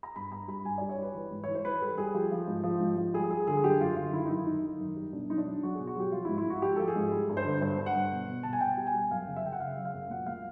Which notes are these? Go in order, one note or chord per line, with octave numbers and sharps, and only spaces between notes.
A#5
G2 B5
G2 A#5
G3 B5
G2 G#5
G3 D5
C#5
G3 B4
E3
G#2
E3 C#5
C5
E3 B4
G3 A4
G3 G#4
F3 G4
F3
G#2
F3
G#2
F3
G3 G#4
G3 G#4
D3 G#4
F#2 G4
F#2 F4
D3 F4
D#3 E4
D#4
F#2 E4
D#3 D#4
D#3
F#2
G3
B2 D4
F#3 D#4
D4
F#3
F#3 F#4
G#4
B2
F#4
F#3 G4
F3 F4
G#2 E4
E4
G#2 F#4
F3 G4
F3 A4
G#4
G#2
G3
G2
C5
D3
G2 C5
G2
F#5
G2
B2
B2
B2 A5
G#5
B2 G5
G3
G#5
G3
F#2 F5
C#3
E5
C#3 G5
F#5
C#3 F5
F#3
F5
F#2
A#2 F#5
A#2 F5